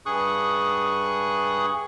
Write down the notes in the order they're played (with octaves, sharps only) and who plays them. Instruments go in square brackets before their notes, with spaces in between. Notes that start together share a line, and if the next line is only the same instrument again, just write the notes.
[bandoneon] G2 G#4 C#6 D#6 F#6